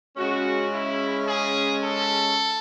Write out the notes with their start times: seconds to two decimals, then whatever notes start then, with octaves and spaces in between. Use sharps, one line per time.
0.17 C#3 G#3 C#4 F#4
0.72 E4
1.27 G#4
1.82 A4